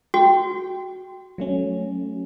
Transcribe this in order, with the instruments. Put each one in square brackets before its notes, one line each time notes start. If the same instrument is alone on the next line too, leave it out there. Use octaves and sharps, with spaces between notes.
[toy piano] F#4 [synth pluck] G5
[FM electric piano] F#3 A3 C#4